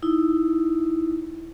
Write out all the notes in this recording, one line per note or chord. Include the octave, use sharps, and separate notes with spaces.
D#4 E4